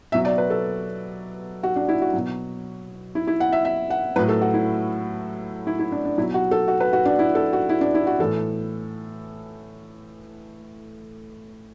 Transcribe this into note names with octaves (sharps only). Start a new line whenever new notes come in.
B2 F#3 E5
D5
B4
A4
F#4
D4
E4
F#4
B2 F#3
E4
E4
F#5
E5
E5
F#5
A2 F#3 B4
A4
F#4
E4
E4
E4
D4
D4
B2 F#3 E4
F#4
A4
F#4
B4
F#4
D4
E4
A4
F#4
E4
D4
E4
F#4
A2 E3 A4